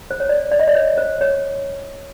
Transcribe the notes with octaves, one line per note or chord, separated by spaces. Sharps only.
C5
C#5
D5
D5
D#5
D5
C#5
C5
C#5